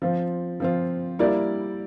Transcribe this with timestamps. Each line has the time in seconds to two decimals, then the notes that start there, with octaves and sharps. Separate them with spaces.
0.02 F3 C4 F4
0.60 F3 C4 F4
1.19 G3 A#3 E4 A#4 D5